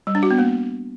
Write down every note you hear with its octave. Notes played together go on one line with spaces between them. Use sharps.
G3
D4
F#4
B3
A#3